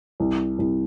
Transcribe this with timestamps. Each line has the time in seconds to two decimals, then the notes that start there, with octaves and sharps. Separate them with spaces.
0.20 C2
0.59 C2